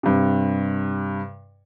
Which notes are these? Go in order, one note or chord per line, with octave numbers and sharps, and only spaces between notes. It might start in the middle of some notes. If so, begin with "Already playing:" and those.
G2 C3